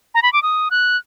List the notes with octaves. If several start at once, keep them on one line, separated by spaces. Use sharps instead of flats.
A#5
B5
D6
D#6
F#6